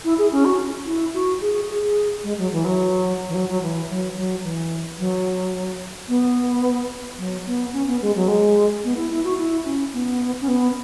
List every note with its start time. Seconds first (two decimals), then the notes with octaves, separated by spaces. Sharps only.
0.05 E4
0.18 G#4
0.32 C#4
0.45 F#4
0.86 E4
1.14 F#4
1.41 G#4
1.70 G#4
2.23 G#3
2.38 F#3
2.52 E3
2.65 F#3
3.28 E3
3.34 F#3
3.49 F#3
3.62 E3
3.89 F#3
4.17 F#3
4.43 E3
4.99 F#3
6.09 B3
7.18 F#3
7.46 B3
7.73 C#4
7.87 B3
8.02 G#3
8.15 F#3
8.28 G#3
8.84 B3
8.97 E4
9.11 E4
9.24 F#4
9.38 E4
9.65 C#4
9.93 B3
10.41 C#4
10.48 B3